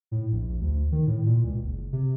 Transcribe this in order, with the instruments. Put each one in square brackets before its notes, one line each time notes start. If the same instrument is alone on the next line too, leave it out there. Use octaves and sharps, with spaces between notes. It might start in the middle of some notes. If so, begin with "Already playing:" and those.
[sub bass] A2
A#1
A#1
D2
D#3
A2
A#2
C#2
F#1
C3